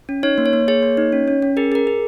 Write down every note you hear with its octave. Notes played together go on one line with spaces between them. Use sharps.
C#4
D#4 C#5
A#3
C#5
A#3
G#4 C#5
A#3
D#4
C#4
C#4
C#4
G#4 A#4
G#4 A#4
G#4